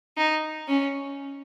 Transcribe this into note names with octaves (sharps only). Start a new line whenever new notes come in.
D#4
C#4